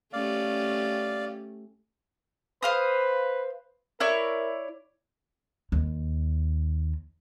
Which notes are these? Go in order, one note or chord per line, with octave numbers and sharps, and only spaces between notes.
A3 C#4 G4 D5 F5
B4 C5 F5 D#6
E4 A#4 C#5 D5
D#2